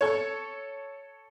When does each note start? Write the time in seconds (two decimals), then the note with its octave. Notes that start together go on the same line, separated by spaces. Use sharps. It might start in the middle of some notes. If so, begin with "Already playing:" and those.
0.01 A4 C#5